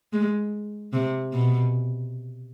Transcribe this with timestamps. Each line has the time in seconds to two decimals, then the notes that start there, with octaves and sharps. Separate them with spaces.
0.13 G#3
0.93 C3
1.33 B2